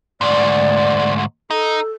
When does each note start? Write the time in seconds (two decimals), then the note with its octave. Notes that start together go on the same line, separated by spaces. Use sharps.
0.21 D2 G#2 D5
1.51 D#4 A4